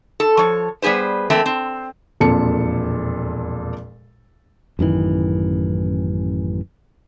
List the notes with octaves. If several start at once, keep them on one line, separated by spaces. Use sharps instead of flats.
A4
F3 C#5
G3 B3 G#4 B4 C5
E3 A3 A#3 C4
C4
E1 F2 A#2 A4 A5 C#7
A1 F#2 D#3 E3